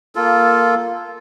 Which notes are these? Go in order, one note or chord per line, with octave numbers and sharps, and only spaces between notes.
A#3 F4 A4